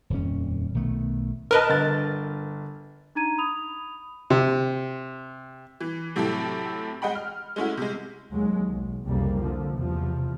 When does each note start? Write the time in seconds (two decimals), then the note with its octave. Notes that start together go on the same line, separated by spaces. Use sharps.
0.10 D#1 F2 C#4
0.74 B1 D#3 A3 B3
1.51 A#4 B4 D#5 A5 F6
1.70 G1 A6
3.15 D4 D#4 A#5 G#6 D#7
3.38 B5 D#6 F7
4.30 C3
5.81 E3
6.16 A2 C3 F#3 E4 G4 A4
7.02 G#3 D#5 F#5 G5 B5
7.15 F6
7.56 G#3 A3 C#4 E4 F#4
7.77 C3 G#3
8.31 D#2 F#3 G#3
8.69 B1
9.05 C2 F2 C#3 G3 A#3
9.41 D3 F3
9.77 E2 C3 F3